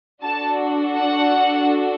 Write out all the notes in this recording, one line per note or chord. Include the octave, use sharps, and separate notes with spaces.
D4 F#4 A4 A5
F#5